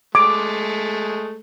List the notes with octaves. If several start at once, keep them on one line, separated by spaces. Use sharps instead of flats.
G#3 A3 D6